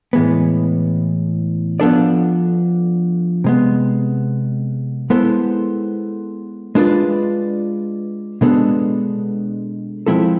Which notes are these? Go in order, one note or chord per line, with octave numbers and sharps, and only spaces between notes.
A2 E3 G#3 B3
F3 B3 D4 A4 D5
C3 G#3 B3
G#3 B3 E4 A4 C5
G#3 D4 F4 B4 D5
B2 G#3 B3 D4 A4
F3 G#3 C4 E4 A4